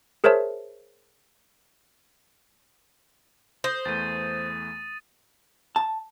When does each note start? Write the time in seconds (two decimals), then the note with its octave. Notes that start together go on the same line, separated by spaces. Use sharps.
0.24 G#4 A#4 C5 C#5 E5 A5
3.64 C5 D#6 A#6
3.85 E2 E3 A3 A6 D#7
5.76 A5